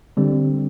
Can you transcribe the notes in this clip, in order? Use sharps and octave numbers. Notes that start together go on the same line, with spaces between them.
D3 G3 C4